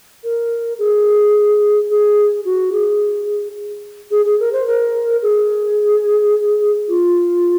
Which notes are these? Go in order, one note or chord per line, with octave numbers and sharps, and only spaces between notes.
A#4
G#4
G#4
F#4
G#4
G#4
G#4
A#4
C5
A#4
G#4
F4